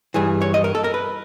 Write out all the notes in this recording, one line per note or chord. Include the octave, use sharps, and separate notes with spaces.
G2 E3 G#4
C#5
D#5
A#4
A4
A#4
B4